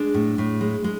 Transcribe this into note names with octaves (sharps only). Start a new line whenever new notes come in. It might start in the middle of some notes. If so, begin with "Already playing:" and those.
Already playing: G#3 D4
A2
A2
G#3
G#3